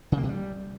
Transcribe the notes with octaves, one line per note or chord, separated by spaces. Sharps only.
C#3
A#3
C3
G3